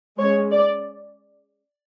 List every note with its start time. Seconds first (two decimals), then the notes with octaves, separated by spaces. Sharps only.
0.19 G#3 C#4 C#5
0.51 D5